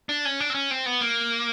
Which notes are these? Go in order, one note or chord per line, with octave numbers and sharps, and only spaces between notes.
D4
C#4
D4
C4
C#4
C4
B3
A#3